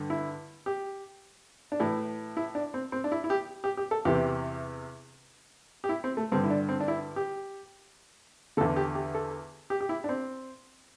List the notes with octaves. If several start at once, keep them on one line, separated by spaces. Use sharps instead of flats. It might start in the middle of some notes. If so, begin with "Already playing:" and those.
Already playing: G2 D3
E4
G4
D4
A2 E3 E4
E4
D4
C4
C4
D4
E4
E4
G4
G4
G4
A4
E2 C3 E3 G4
G4
E4
C4
A3
G2 D3 C4
E4
D4
C4
D4
E4
G4
E2 D3 A4
G4
G4
A4
G4
G4
E4
D4
C4